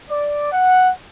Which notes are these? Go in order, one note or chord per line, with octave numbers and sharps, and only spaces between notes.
D5
F#5